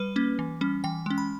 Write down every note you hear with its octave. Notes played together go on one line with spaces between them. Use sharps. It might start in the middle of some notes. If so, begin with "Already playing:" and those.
Already playing: G3 B4
A#3 C#4
E3
G3 C#4
E3 G5
G#3 C#4
B5